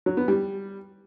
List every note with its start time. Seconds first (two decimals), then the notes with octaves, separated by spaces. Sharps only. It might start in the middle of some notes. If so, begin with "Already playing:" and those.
0.06 F#3
0.17 B3
0.28 G3